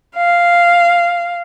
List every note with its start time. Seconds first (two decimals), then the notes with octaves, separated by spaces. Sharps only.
0.16 F5